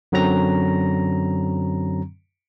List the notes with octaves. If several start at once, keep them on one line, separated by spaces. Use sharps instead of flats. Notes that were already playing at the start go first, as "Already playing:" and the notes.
F#2 D3 F#3 C4 A#5 A#6